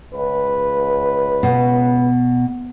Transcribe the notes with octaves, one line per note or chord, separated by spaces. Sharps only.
C#2 B4
B2